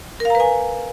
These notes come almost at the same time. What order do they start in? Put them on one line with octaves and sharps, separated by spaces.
A#4 F5 A#5 B4 G#5